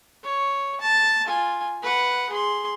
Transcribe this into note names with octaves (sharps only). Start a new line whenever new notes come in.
C#5
A5
F4 G#5
B4 F#5
G#4 C6